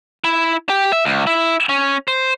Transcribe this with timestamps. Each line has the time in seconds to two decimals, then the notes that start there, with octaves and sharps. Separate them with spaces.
0.24 E4
0.70 G4
0.92 E5
1.05 C#2
1.27 E4
1.69 C#4
2.08 C5